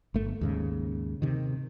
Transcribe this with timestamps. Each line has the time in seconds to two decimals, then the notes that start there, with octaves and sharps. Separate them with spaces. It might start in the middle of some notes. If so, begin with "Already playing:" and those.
0.14 G1 A3
0.41 D#2 G#2 C#3
1.22 C3 D#3